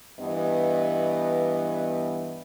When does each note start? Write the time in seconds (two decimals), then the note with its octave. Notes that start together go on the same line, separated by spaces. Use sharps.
0.19 G2 E3 B3 D#5